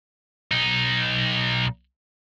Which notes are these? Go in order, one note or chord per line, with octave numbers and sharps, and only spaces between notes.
B1 D#4